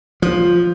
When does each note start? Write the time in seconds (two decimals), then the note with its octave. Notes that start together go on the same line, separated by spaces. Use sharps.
0.22 F3